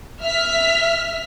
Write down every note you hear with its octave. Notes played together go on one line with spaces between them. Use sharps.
E5 F6 B6